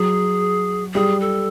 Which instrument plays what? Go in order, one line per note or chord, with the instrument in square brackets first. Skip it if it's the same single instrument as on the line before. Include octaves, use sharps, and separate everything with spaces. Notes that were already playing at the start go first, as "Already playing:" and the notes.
Already playing: [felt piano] F#3 [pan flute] G#4
[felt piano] G3 [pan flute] G#4
[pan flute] A4